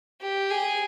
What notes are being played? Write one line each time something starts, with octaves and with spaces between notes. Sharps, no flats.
G4
G#4